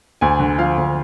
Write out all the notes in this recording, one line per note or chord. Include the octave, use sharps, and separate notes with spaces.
D2 G#5
D3
F3 F5
D2